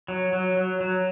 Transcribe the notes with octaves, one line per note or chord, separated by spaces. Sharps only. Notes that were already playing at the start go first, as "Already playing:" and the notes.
F#3
F#3
F#3
F#3